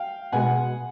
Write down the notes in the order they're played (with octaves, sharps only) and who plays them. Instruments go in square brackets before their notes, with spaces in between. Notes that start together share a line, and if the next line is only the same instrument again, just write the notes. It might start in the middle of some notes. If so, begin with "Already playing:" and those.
Already playing: [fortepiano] F5 G5
B2 G#3 F#5 G#5